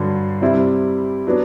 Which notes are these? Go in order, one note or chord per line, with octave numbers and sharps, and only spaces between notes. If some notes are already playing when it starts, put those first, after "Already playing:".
Already playing: G2 D3 F#3
C3 G3 C4 E4
F#3 B3 D4